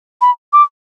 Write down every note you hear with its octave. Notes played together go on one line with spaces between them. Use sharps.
B5
D6